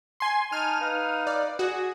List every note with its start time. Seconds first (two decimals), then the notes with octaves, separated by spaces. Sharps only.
0.20 G#5 C6
0.52 D#4 G#5 A5 F6 D#7
0.81 D#4 B4 F5
1.27 D5
1.59 F#4 G#4 D#6